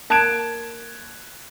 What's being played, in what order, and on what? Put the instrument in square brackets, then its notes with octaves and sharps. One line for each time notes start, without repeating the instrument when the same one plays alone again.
[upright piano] A#3 A5 F#6 G#6 D7 E7